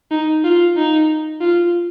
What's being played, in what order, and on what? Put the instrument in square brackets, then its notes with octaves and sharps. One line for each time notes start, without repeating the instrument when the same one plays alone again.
[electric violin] D#4
F4
D#4
F4